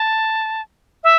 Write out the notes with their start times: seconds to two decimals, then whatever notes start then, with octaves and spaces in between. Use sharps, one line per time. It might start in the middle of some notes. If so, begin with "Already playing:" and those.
Already playing: A5
1.04 E5